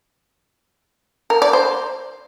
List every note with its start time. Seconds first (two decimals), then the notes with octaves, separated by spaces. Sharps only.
1.30 A#4
1.42 D5
1.53 C5